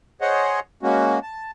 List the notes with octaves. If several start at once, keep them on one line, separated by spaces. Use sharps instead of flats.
G#4 C5 C#5 D#5 F#5
G#3 A#3 C#4 F#4
A5